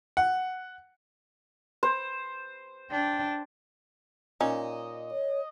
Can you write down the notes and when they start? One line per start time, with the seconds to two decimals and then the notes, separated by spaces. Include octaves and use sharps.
0.17 F#5
1.83 C5
2.91 D4 G5
4.41 A#2 C#4 D#4 D#5
5.10 C#5